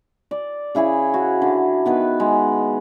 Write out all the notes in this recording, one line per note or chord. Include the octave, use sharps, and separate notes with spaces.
D5
C#3 E4 G#4 C#5
F#4
D3
D#3 B3 B4
G#3